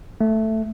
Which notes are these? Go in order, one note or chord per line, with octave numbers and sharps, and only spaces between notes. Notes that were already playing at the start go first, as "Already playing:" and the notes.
A3